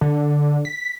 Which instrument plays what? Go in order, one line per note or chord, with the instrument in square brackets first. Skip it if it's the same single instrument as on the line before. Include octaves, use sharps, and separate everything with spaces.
[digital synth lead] D3
B6